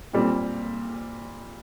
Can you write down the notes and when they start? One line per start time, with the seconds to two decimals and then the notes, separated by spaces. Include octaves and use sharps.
0.13 A#2 G3 C4